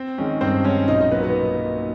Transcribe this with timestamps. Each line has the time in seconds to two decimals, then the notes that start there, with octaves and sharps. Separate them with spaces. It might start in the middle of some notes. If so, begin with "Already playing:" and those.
Already playing: C4 C5
0.18 D#3 G#3 C#4
0.41 G2 C4 C5
0.64 D#3 G#3 C#4 C#5
0.88 B1 D#4 D#5
1.00 D#4 D#5
1.11 A#2 F#3 A#3 B3 B4
1.23 B3 B4